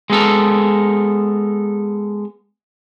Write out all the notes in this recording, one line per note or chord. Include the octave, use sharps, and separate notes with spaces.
G#3 B3 A4 A#4